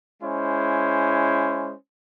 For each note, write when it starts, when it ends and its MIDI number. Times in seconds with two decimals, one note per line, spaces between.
0.22 1.73 56
0.22 1.73 61
0.22 1.73 64
0.22 1.73 72